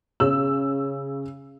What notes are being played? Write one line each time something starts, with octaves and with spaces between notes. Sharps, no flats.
C#3 C#4 E6